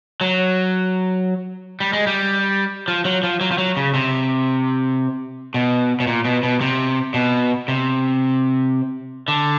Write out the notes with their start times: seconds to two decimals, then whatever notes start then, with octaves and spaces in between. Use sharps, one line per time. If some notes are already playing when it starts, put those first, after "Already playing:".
0.21 F#3
1.80 G3
1.93 G#3
2.07 G3
2.88 F3
3.05 F#3
3.23 F3
3.41 F#3
3.52 F3
3.58 F#3
3.77 C#3
3.94 C3
5.54 B2
6.00 B2
6.07 A#2
6.25 B2
6.43 B2
6.61 C3
7.14 B2
7.68 C3
9.28 D3